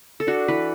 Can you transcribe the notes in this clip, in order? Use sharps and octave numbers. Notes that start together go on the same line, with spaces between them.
A4
D4 F#4
E3 B4